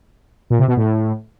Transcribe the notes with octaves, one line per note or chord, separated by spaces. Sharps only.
A#2
C3
B2
A2